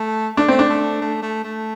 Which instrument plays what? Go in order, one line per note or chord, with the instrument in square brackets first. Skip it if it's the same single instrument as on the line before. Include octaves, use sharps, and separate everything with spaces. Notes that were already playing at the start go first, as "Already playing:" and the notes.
Already playing: [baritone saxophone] A3
[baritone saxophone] A3 [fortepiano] D4
[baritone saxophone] A3 [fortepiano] C4
[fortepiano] D4
[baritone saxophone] A3
A3
A3
A3